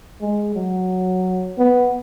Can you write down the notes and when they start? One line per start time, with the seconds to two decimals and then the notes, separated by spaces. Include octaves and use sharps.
0.21 G#3
0.55 F#3
1.58 B3